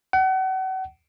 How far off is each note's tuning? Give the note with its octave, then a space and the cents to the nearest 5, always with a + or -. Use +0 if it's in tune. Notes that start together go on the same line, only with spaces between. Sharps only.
F#5 +35